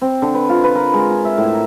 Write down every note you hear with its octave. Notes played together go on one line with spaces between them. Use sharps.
C4
D3
B4
F4
B4
A#4
G#3
G#4
E5
A2
A#4